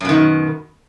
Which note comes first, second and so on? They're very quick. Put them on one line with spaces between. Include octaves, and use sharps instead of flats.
F#2 B2 D#3